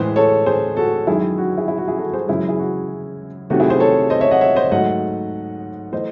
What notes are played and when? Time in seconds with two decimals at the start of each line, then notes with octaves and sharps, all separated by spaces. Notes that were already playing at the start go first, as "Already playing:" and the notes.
Already playing: A2 E3 G#3 G#4 C5
0.16 A4 C#5
0.46 G#4 C5
0.77 F#4 A4
1.07 F#2 D#3 G#3 E4 G#4
1.38 F#4
1.58 E4 G#4
1.68 E4 G#4
1.78 F#4
1.88 E4 G#4
1.98 F#4 A4
2.13 G#4 C5
2.28 F#2 C#3 E3 G#3 E4 G#4
2.49 E4 G#4
2.59 F#4
3.50 C3 D#3 F#3 A3 F#4
3.60 E4 G#4
3.70 G#4 C5
3.80 A4 C#5
4.10 C5 D#5
4.21 C#5 E5
4.31 D#5 F#5
4.41 C#5 E5
4.56 C5 D#5
4.72 G#2 F#3 A3 D#5 F#5
5.92 E3 A3 C5 D#5